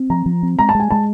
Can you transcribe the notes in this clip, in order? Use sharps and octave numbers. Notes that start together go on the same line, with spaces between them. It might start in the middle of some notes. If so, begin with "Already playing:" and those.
Already playing: C4
F3 A#5
F3
C4
G#3 A#5
A5
G#3
G#5
G#3 A5